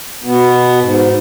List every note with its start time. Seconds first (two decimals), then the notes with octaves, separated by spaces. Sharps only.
0.24 B2 B3
0.80 G#2